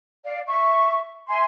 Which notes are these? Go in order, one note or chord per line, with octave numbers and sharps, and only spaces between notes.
D5 F5
E5 C#6
E5 G#5 C6